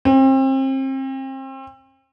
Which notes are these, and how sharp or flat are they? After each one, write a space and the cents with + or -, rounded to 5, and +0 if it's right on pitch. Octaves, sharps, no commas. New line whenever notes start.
C4 +35